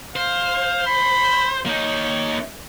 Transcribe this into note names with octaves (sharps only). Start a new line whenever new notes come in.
C5 F5
B5
A#3 D#4 C#5